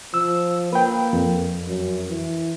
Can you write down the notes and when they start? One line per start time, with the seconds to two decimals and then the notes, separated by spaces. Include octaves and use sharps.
0.14 F3 E6
0.73 A#3 B4 G5
1.13 F2
1.68 F#2
2.10 E3